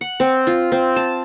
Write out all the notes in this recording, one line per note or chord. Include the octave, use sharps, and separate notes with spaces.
F#5
C4
F4
C4
A5